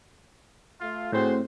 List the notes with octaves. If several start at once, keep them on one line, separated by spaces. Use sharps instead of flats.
A3 F4
A2 C4 F#4 G#4 C5